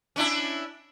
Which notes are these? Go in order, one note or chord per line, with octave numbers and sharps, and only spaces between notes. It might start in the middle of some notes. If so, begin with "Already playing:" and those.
C#4 D4 E4